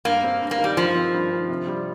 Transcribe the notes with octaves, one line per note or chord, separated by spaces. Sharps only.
G2 A#3
C4
G2
A#3
D#3
G3
G2 F3
C4
G2
D#3
C3
G3